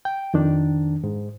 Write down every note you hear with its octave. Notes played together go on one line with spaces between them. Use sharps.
G5
F2 D#3 D4
G#2